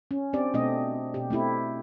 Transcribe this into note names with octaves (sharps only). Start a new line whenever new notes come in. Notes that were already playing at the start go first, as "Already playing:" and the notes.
C#4
C4 D4 G4 D5
B2 A3 C4 D4 D#5
B2 G4
A3 C4 E4 G4